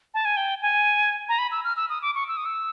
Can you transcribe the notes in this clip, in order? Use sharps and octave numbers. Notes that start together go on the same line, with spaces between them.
A5
G#5
G5
G#5
A#5
B5
E6
F6
E6
D#6
D6
C#6
E6
D#6
E6